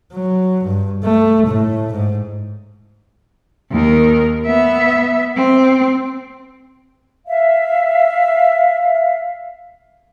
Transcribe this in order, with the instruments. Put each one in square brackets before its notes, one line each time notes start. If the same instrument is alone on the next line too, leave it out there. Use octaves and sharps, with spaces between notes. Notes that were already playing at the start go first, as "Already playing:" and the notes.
[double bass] F#3
G2
A3
A2
G#2
[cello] D#2 A#4
B3 E5
C4
[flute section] E5 F5